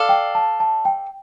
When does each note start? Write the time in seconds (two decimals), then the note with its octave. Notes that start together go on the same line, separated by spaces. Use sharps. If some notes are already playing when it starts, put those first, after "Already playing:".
Already playing: A4 D5 F5
0.09 G5
0.35 A5
0.60 A5
0.85 G5